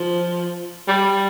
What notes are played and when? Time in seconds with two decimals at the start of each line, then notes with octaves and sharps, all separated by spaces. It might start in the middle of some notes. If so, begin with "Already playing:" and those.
Already playing: F3
0.88 G3